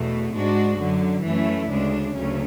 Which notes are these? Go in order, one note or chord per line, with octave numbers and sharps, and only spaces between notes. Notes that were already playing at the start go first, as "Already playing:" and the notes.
Already playing: E2 B2 A3
G#2 G#3 D4 F#4
F#2 D3 F#3
F#2 E3 A3 C#4 E4
D2 C#3 G#3 D4
D2 C#3 F#3 A3 C#4